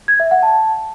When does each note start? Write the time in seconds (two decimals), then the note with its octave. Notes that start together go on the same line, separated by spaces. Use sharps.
0.08 G#6
0.20 E5
0.31 F#5
0.43 A5